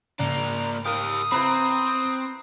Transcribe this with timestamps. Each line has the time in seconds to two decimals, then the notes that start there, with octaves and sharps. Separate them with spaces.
0.19 G#2 C#3 A#3 D4 A#5
0.85 G4 A#4 F5 D#6
1.32 C4 E4 B4 A#5 B5